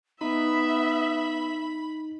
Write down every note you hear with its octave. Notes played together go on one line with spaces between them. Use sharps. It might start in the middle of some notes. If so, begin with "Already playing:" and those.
B3 D#4 E5 B5